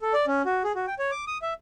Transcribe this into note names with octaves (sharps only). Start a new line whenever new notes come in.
A4
D5
C#4
F#4
G#4
F#4
G5
C#5
D6
D#6
E5